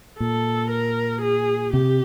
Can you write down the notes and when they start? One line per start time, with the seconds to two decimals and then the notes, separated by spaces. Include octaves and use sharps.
0.20 A#2 A4
0.70 A#4
1.22 G#4
1.73 C3 G4